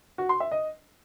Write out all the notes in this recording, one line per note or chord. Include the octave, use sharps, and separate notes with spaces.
F#4
C6
E5
D#5